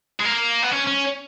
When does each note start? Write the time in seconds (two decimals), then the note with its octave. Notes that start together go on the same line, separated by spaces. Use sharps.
0.20 G#3
0.25 A#3
0.63 B3
0.71 C#4
0.87 C#4